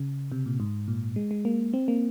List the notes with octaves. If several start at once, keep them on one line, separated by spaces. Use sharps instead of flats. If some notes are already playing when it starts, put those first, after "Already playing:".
Already playing: C#3
C3
A#2
G#2
A#2
G#3
G#3
A#3
C4
A#3